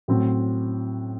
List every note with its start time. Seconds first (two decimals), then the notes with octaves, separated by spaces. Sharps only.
0.08 A2 F#3 C4